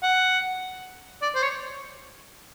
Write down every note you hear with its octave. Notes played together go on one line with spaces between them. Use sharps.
F#5
D5
C5
C#5